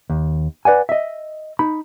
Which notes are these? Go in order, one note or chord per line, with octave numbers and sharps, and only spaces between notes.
D#2
B4 D5 F#5 G#5
D#5 E5
D#4 B5